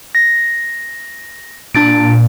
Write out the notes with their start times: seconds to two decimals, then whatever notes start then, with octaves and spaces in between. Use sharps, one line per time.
0.15 A#6
1.75 A#2 D4 A6 D7